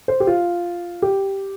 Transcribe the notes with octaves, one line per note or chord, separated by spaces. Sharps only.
C5
G4
F4
G4